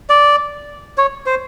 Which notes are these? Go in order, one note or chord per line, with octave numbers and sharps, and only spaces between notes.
D5
C#5
C5